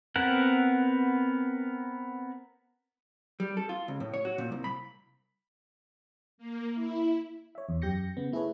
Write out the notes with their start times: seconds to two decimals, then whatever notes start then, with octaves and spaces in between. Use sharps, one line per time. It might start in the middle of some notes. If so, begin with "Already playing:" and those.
0.16 B3 C4 A#4 F#5
3.40 G3
3.57 A4
3.69 F4
3.88 C#2
4.00 A2
4.14 C#5
4.25 F#4
4.38 A#2
4.52 C2
4.64 B5
6.38 A#3
6.75 E4
7.55 C#5 E5
7.69 E2
7.82 F#2 G4 G6 A#6 C#7
8.17 C#3 B3
8.32 A3 E4 G#4 A4 B4 C#5